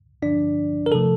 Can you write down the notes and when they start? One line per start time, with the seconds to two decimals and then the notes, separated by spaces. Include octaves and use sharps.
0.22 G2 D3 F3 D4 D5
0.86 A#4
0.92 C3 F3 A3 A4